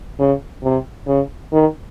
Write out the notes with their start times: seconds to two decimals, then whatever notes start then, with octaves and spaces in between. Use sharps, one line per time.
0.19 C#3
0.64 C3
1.07 C#3
1.52 D#3